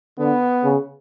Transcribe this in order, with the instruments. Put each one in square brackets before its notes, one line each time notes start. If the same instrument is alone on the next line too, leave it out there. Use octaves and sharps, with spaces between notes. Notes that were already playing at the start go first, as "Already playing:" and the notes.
[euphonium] D3 [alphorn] B3
[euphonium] C#3